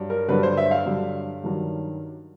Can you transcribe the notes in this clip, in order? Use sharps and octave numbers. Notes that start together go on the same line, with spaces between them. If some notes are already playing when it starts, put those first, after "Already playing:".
Already playing: G2 F#3
A#4
G2 D3 F#3 B4
C5
E5
F5
G2 D3 F#3
G2 D#3 F#3